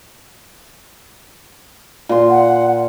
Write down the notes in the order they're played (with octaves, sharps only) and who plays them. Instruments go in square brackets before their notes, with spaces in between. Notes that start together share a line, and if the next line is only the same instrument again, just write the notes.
[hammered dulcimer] A#2 C6
[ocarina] F#5